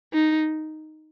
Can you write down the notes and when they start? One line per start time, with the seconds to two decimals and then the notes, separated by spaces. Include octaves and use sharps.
0.14 D#4